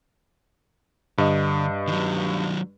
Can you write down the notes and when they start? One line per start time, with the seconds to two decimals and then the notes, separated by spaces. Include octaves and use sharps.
1.18 G2 D3 D#5
1.87 D#3 F#3